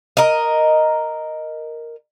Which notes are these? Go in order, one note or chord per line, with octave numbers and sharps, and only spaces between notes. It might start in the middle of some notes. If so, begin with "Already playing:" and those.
A#4 D#5